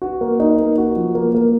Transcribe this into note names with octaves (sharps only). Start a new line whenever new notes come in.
F#4
A#3
D#4
A#3
F#4
F3
A#3
A#3